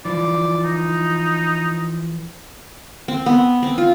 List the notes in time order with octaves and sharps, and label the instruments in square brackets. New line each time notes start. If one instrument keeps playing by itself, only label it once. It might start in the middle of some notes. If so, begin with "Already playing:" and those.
[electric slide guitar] E3 F3 [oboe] D5
[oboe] D#4
[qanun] C4
B3
C4
F4